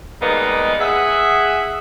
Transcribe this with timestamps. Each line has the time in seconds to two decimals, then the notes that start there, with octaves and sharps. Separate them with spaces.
0.22 G3 G#3 A#3 B3 D#4
0.80 G#4 E5 F#5